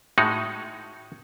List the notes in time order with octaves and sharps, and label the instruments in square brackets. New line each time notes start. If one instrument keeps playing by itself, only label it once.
[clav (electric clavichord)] A2 G#3 D#4 F#4